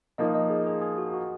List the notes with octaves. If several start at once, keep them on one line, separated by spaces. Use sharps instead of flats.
F3 A#3 D#4 D#5
D#5
G#4
G#4
G#4
F#4
F#4